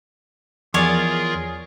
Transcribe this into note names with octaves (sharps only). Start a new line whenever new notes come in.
E2 F3 F4 G#4 A#4 C#5 D5 G#5